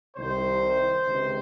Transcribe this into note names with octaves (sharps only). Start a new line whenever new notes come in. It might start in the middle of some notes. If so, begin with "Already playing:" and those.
C2 C3 D#3 C5
C#2 C3 D#3